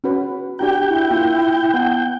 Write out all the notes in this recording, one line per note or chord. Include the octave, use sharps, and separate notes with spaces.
C#4 F#4 B4
D4 F#4 G4 G5 A#5
E4
A#3 F4
B3 F#5 A5